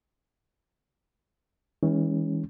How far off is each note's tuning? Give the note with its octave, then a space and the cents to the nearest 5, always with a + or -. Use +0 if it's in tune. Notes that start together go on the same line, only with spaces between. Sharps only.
E3 -40 G#3 -25 C#4 +0